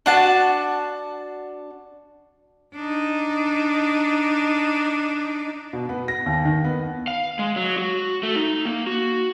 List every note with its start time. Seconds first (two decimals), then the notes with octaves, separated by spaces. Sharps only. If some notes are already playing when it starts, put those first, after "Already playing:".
0.06 D4 F#4 A5
2.75 D4 D#4
5.73 B2
5.89 B3
6.08 A#6
6.26 D#2
6.45 D#3
6.64 B3
7.07 F5
7.39 G#3
7.56 F#3
7.78 F#4
8.23 A3
8.36 D#4
8.65 A#3
8.87 F#4